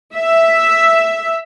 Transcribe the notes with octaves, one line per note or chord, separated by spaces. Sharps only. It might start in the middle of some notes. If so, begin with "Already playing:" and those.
E5